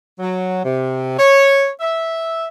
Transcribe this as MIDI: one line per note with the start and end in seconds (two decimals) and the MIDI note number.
0.19 0.64 54
0.65 1.18 48
1.19 1.70 73
1.81 2.47 76